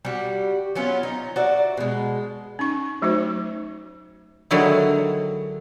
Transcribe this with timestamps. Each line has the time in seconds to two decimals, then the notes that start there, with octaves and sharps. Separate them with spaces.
0.05 G3 F#4
0.75 F#3 B3 C#4 F4
1.03 D#4
1.36 F#4 D5 E5
1.77 B2 G#3
2.59 C#4 D#4 C#6
3.02 F#3 A3 D#4 F#4 C5
4.51 D3 D#3 F#3 G#3 E4